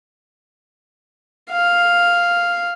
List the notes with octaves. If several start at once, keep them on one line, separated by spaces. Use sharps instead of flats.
F5